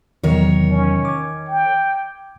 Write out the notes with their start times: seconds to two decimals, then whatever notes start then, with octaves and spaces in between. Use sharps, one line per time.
0.23 E2 C3 D#3 F#3 A#4 C#5
0.70 C#4
1.05 D6 G#6
1.48 G5